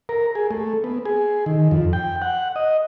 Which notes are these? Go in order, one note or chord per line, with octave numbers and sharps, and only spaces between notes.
A#4
G#4
A3
B3
G#4
D#3
F2
G5
F#5
D#5